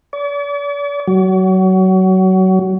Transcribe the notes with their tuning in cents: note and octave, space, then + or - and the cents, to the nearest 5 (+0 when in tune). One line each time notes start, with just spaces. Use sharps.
D5 -45
F#3 +25